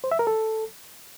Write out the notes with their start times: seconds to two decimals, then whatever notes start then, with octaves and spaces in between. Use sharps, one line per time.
0.04 C5
0.12 E5
0.19 A#4
0.27 A4